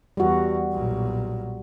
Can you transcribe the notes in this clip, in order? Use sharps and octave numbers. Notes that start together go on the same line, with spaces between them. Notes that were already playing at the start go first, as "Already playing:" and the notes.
E2 G3 F#4
B1 A#2